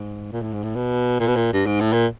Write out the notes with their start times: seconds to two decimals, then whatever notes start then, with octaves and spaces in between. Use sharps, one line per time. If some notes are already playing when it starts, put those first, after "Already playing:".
Already playing: G#2
0.32 A#2
0.42 A2
0.53 G#2
0.63 A2
0.75 B2
1.19 A#2
1.27 B2
1.36 A#2
1.53 G2
1.66 G#2
1.80 A2
1.93 A#2